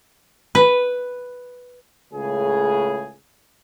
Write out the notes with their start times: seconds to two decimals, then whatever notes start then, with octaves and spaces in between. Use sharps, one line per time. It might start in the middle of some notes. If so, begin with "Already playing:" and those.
0.55 B4
2.13 C#2 A2 C#3 G#4